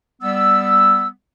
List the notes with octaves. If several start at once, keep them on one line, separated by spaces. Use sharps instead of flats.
G3 B3 E6